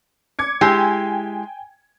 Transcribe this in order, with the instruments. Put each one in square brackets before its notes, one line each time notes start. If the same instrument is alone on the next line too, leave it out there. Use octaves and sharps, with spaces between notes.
[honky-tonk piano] D6 G#6 C#7
[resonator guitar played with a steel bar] G#3 E4 G4 [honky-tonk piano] G5 G#5